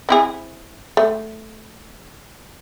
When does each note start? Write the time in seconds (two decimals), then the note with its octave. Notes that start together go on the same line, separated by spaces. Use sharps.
0.09 C4 E4 G#4
0.97 A3